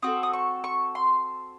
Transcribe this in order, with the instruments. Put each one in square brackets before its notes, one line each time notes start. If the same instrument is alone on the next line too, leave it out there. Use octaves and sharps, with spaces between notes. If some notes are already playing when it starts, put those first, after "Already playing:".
[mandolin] C4 F#4 A4 D#6
D#6
C#6
C#6
C6